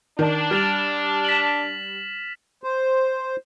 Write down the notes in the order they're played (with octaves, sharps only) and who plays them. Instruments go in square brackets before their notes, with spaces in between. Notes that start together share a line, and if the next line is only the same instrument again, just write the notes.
[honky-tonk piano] D#3 [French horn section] D4
[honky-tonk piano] G3 [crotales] F6 A6 F7
[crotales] B6 E7 F#7
[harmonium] C5